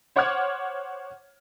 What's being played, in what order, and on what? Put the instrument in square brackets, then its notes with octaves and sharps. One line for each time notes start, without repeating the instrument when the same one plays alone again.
[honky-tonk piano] C5 C#5 F#5 D6 F6 G#6